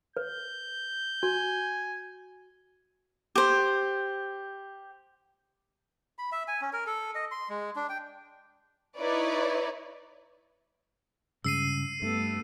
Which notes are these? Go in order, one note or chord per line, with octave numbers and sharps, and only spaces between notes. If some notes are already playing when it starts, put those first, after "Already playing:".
B4 G6
F#4 G#5
G4 C5
B5
E5
G#5
C#4
A#4
A4
D#5
C6
G#3
D4
G5
D#4 E4 B4 C#5 D5
G2 C#3 G#3 E6 C7 D#7
G2 A3 B3